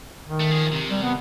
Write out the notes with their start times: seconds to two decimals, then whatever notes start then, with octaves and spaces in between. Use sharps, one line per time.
0.25 D#3
0.40 A3
0.52 F3 G#4
0.73 C3
0.90 G3
1.03 B3